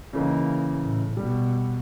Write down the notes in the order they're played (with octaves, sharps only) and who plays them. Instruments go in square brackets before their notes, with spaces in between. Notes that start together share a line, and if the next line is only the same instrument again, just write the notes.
[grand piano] C#3 E3 D#4 [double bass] A#3
[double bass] A2
[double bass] B2 [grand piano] G3